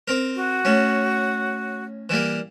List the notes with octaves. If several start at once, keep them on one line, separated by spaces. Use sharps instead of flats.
C4 A#4
F#4
A2 C#4
E3 G3 A#3